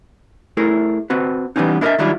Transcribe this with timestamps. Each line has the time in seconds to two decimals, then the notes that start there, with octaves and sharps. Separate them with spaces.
0.57 A3 E4 G#4 A#4
1.10 C4 F#4 B4
1.56 E3 G3 A#3 B3 C#4 D#4
1.81 D4 E4 A4 A#4 D#5 E5
1.99 D#3 F#3 G3 D4 E4 F4